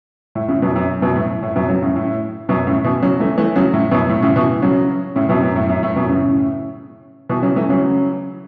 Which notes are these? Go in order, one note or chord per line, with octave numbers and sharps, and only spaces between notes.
A2
A2 C#3
F#2 B2
F#2
F#2 B2
A2
A2
F#2 B2
C#3 F#3
A2 C#3
A2
F#2 B2
A2 C#3
B2 E3
C#3 F#3
E3 A3
E3 A3
C#3 F#3
A2
F#2 B2
A2
A2 C#3
B2 E3
C#3 F#3
A2 C#3
F#2 B2
F#2
A2
F#2
A2
F#2 B2
A2 C#3
B2 E3
C#3 F#3
E3 A3
C#3 F#3